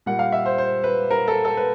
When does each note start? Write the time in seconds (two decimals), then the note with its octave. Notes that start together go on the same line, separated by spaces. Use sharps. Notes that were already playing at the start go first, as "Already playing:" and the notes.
0.06 A#2 G3 A#3 F#5
0.19 F5
0.32 E5
0.46 C5
0.58 C5
0.84 B4
1.11 A#4
1.28 A4
1.45 A4
1.57 B4